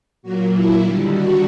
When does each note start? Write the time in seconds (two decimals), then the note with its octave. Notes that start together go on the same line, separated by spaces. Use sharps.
0.23 A#2 F#3 A#3 F#4
0.52 E4
0.81 D#2 D3 G3 F4
1.10 F#4